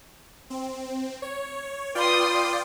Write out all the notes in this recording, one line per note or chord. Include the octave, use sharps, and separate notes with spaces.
C4
C#5
F4 B4 D5 G5 C6 D#6